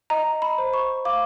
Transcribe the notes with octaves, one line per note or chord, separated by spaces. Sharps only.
D#5 A#5
B5
C5
C#6
F5 D6